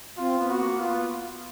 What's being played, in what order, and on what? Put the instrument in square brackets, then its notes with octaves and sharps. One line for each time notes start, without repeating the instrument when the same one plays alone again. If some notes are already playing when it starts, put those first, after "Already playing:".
[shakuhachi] C4 [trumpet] F4
[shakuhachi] B3
[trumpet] F#4
[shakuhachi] A#3
[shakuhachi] B3 [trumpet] F4